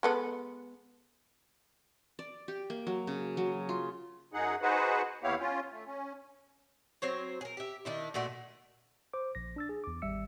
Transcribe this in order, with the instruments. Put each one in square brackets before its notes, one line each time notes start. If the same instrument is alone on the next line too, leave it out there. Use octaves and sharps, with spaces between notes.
[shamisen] G#3 B3 A4
[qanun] D5
G4
A#3
F#3
C#3
F#3
F4
[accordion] F#2 D#4 G#4 F#5
D#4 F#4 G#4 B4 C5 F#5
D#2 B3 E4 G4 C#5 F5
C#4 F4
A3
C#4
[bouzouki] F#3 C4 C5 C#5
G#4 A#4
G4 E5
D#3 D4 E4
A#2 A3 F#4 D5
[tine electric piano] C5 D6
A#1 A#6
D4 E6 A6
G#4
E2 D6
G#1 G3 E5 E6 C#7